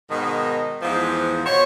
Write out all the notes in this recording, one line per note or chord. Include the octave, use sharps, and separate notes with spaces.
G#2 B2 D#3
E2 G#2 E3 F3
B2 C5 C#5